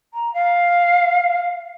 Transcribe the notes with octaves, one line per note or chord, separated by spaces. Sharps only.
A#5
F5